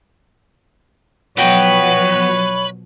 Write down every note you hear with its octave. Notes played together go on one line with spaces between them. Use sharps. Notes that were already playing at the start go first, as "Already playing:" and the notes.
B2 F3 F#3 B3 F#4 B4 C#5 G5